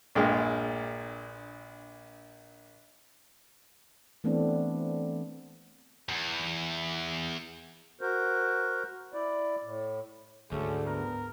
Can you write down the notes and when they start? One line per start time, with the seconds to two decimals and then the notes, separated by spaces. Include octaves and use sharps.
0.15 A#1 G2 A#2 G#3
4.24 E3 A3 B3 C4 D4
6.09 E2
8.01 F#4 A#4 C5
9.14 E4 D5
9.63 A2
10.52 D2 G#2 C#4 G#4 A4
10.87 B3 A#4